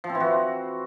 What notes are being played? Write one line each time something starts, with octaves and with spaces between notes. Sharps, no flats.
F3
C4
E3
F#4